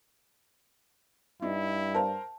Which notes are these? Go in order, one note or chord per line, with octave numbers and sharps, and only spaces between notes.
G2 D#4 E4
A#4 C5 F5 A5